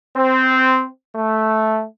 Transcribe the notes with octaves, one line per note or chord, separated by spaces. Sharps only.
C4
A3